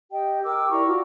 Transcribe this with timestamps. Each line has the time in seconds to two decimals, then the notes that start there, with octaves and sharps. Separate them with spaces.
0.11 G4 D#5 G5
0.45 A#4 G5 D6 E6
0.72 E4 D5 A#5 C#6
0.86 F4 F#4